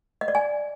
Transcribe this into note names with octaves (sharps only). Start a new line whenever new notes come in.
D#5
D5
G#5